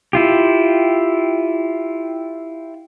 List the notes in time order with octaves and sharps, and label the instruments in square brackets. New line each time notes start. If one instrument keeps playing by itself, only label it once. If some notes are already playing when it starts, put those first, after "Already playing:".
[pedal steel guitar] E4 F4 G4